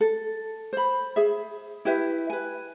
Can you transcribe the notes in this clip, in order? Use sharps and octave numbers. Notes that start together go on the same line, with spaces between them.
A4
C5 B5
G#4 E5
E4 G4 B4 E5
B4 G#5